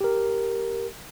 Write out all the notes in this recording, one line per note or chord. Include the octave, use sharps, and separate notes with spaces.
G4 A#4